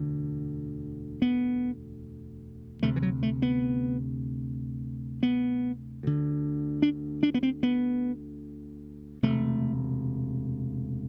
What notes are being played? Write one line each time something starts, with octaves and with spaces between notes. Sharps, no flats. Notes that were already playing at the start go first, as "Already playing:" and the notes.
Already playing: E1 D2 D3
B3
D2 C3 A3
E3
F#3
A3
B3
B3
D2 D3
D4
D4
B3
C4
B3
E1 D2 C3 A3